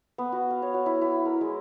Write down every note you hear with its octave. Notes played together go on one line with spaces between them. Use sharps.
B3
F#4
F5
C#5
F#4
E4
E4
A#4
G#3